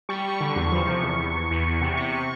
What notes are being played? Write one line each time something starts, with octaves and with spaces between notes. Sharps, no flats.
G3 C#6
G3
D3
E2
F3
C3
E2
E2
E2
E2
E2
C3
C3 C#6